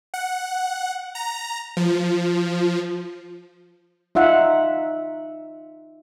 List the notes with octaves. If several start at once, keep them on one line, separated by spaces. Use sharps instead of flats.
F#5
A#5
F3
D#4 F4 E5 F#5